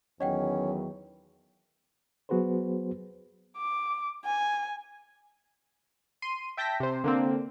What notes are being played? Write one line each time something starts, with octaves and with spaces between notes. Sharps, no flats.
E2 D#3 F#3 C#4 D#5 F#5 G5
F#3 B3 F#4 G#4 B4 C5
D6
G#5
C6 D#7
E5 G5 A5 G6 A#6 B6
C3 C5
D3 A#3 C4